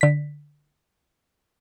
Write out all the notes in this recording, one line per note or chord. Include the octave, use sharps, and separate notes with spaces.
D3 B6